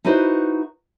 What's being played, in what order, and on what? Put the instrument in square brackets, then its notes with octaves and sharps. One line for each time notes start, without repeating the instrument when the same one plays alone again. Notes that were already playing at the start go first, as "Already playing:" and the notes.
[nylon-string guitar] D#4 E4 F#4 B4 C5